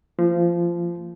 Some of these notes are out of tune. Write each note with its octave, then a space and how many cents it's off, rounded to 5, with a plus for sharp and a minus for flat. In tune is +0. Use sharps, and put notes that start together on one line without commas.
F3 -20 A#3 -40